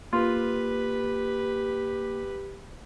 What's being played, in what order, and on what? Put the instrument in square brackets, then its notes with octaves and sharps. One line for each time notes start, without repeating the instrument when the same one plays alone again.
[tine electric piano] A#3 [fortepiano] F4 [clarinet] G4 [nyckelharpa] B4